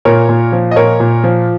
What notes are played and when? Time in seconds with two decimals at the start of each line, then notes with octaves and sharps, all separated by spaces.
0.05 A#2 A#4 C#5
0.29 A#2
0.52 F3
0.71 D#5
0.76 A#2 A#4 C#5
1.00 A#2
1.24 F3